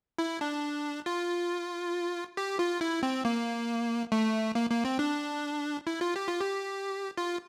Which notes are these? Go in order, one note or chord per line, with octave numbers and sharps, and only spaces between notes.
E4
D4
F4
G4
F4
E4
C4
A#3
A3
A#3
A#3
C4
D4
E4
F4
G4
F4
G4
F4